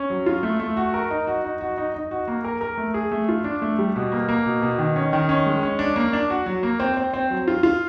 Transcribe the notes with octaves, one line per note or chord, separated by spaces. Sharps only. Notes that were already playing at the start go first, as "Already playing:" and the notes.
Already playing: C#4
F#3
F4
A3
A3
F#4
A#4
D#4
F#4
D#4
F#4
D#4
D#4
F#4
A#3
A#4
A#4
A3
G#4
A3
F4
D4
A3
G3
B2
A#3
A#3
B2
B2
D#3
C#4
D#3
C#4
G#3
C#4
D4
A#3
D4
F#4
F#3
A#3
C4
C4
C4
F#3
F4
F4